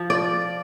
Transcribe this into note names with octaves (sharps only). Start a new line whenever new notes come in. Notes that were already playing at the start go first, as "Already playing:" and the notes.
Already playing: F3
D5